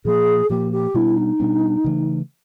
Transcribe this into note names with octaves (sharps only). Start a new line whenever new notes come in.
A#2 F3 A#3 G#4
A#2 F3 A#3 G4
G4
B2 G3 B3 D4 E4
D#4
B2 G3 B3 D4
C#3 E3 A3